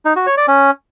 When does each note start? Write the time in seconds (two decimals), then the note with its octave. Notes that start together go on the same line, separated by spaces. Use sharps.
0.05 D#4
0.16 F#4
0.27 C#5
0.37 D5
0.48 C#4